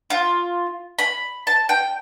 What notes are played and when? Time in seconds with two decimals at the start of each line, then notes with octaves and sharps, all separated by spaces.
0.10 F4
0.99 B5
1.47 A5
1.69 G5